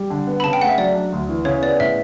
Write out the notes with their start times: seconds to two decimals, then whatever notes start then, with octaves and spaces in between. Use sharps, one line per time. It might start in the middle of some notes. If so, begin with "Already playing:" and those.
Already playing: G3
0.10 D3
0.27 B3
0.40 B5
0.44 C#3 A5
0.53 G5
0.61 A3 F#5
0.69 E5
0.78 F#3 D5
0.94 D4
1.12 D2
1.29 E3
1.45 C#3 C#5
1.62 B3 D5
1.79 A2 E5